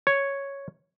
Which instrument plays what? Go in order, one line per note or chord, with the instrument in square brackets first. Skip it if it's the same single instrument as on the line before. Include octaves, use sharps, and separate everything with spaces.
[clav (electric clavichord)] C#5